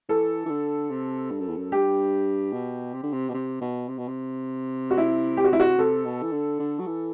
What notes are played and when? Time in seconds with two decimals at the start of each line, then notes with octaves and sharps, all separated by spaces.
0.09 E3 A4
0.45 E3
0.50 D3
0.90 C3
1.31 G2
1.40 F#2
1.48 E2
1.57 F#2
1.72 G2 G4
2.53 B2
2.94 C3
3.03 D3
3.13 C3
3.29 B2
3.34 C3
3.61 B2
3.88 C3
3.98 B2
4.08 C3
4.90 F#4
4.97 E4
5.37 G4
5.44 F#4
5.53 E4
5.60 F#4
5.78 C3 A4
6.05 B2
6.23 E3
6.32 D3
6.60 D3
6.79 F#3
6.87 E3